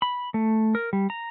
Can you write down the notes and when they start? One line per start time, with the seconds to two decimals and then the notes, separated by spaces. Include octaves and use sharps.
0.02 B5
0.34 A3
0.75 A#4
0.93 G3
1.10 A#5